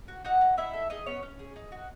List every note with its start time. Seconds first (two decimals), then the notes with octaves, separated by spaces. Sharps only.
0.08 F#4
0.24 D#4 F#4 F#5
0.41 D#4
0.58 D#4 E4 E5
0.73 A4
0.90 D#4 G#4 D#5
1.06 B3 C#4 C#5
1.23 C#4
1.39 G#4
1.56 D#4
1.72 F#4